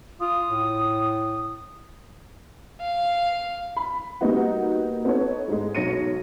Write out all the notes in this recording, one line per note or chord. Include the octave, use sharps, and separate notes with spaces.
F4 D#6
A2
F5
B5
G3 A#3 B3 D#4 F#4
B3 D#4 A4 C#5
G#2 G#3
B1 F#3 C#5 A#6 C#7 D#7